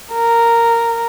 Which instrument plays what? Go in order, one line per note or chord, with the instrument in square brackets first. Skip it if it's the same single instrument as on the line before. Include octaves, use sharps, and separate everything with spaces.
[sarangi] A#4